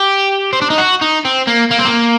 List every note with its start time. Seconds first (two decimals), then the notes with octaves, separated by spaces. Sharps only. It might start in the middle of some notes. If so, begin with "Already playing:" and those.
Already playing: G4
0.53 C4
0.62 D4
0.70 D#4
0.78 F#4
1.01 D#4
1.25 C4
1.47 A#3
1.71 A#3
1.78 C4
1.85 A#3